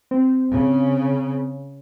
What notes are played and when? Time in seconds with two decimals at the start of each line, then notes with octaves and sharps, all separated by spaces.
0.11 C4
0.50 C#3